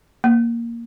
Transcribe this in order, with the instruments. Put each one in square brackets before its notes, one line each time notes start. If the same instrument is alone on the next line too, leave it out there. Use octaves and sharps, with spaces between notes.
[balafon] A#3